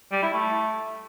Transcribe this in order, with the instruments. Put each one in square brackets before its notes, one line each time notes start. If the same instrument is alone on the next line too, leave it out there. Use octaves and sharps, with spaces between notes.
[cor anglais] G3
E4
A3